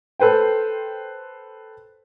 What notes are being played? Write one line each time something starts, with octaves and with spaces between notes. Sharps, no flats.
A4 B4 C5 G5